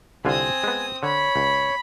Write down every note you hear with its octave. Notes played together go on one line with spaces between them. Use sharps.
C2 D3 C4 F4 G#5 D#6
G#3 B3
D3 C#5 B5
C#2